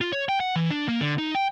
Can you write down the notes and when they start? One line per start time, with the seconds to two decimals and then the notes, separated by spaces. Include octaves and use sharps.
0.01 F4
0.13 C#5
0.29 G5
0.40 F#5
0.56 E3
0.71 D4
0.88 A#3
1.00 D3
1.18 D#4
1.35 G5